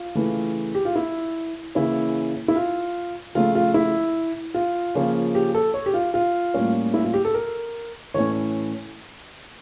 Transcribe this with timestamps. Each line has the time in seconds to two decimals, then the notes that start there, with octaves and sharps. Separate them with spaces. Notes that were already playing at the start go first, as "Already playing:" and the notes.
Already playing: F4
0.15 C#3 E3 A3
0.75 G4
0.85 F4
0.96 E4
1.75 C#3 E3 A#3 C#4 E4
2.48 E4
2.56 F4
3.35 C#3 F3 A3 F4
3.55 F4
3.74 E4
4.54 F4
4.95 C#3 F3 A#3 C#4
5.35 G4
5.55 A4
5.74 C#5
5.86 G4
5.94 F4
6.14 F4
6.54 A2 G3 A#3 C#4
6.94 E4
7.04 F4
7.13 G4
7.25 A4
7.34 A#4
8.14 A2 E3 A3 C#4 C#5